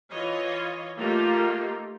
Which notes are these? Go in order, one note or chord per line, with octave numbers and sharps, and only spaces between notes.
E3 F4 C#5 D#5
A3 A#3 D#4 F4 G4